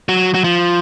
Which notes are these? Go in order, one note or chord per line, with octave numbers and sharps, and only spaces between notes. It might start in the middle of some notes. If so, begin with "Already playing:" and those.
F#3
F#3
F3